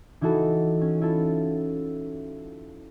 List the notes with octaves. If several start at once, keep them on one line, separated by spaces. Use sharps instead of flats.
E3 D#4 E4 F#4 A4
C#4
E4 F4 A4